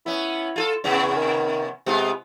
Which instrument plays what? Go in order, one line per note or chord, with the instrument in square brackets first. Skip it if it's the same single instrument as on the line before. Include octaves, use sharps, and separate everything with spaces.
[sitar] B3 C#4 [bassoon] E4
[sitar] F4 G#4 A4
[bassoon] E2 [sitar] C3 B3 C#4
[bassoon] D#3
[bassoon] C3 [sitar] G#3 B3 F4